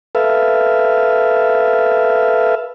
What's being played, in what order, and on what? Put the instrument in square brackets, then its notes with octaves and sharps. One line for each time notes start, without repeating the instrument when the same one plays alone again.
[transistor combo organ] A4 B4 E5 F5